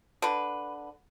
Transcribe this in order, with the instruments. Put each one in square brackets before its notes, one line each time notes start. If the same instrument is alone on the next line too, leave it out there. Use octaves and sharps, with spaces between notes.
[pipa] D3 B4